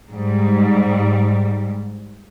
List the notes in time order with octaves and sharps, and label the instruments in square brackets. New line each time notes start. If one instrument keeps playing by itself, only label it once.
[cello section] G#2 G3